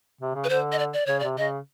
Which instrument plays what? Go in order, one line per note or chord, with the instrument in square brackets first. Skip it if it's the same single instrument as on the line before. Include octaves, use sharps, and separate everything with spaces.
[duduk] C3
C#3
[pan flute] B4
[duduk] D3 [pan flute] C5
[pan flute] D#5
D5
D5
[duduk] C#3 [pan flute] C#5
[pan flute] D5
[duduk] C3
[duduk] C#3 [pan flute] D#5